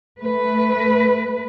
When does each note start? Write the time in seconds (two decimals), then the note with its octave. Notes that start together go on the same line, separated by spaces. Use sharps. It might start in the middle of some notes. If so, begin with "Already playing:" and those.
0.19 A3 B4